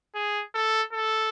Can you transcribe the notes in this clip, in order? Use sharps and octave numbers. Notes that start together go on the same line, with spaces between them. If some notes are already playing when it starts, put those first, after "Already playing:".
G#4
A4
A4